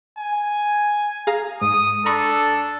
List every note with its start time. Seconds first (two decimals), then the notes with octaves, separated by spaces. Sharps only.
0.18 G#5
1.27 G#4 F5 A#5
1.61 G#2 D#6
2.06 D4 A4 A#5 B5 C#6